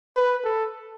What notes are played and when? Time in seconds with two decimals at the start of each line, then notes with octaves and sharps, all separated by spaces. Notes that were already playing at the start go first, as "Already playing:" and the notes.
0.17 B4
0.45 A4